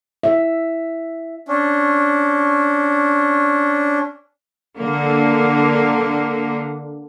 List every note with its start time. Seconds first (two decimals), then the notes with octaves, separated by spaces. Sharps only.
0.23 E5
1.48 C#4 D4
4.77 D3 A#3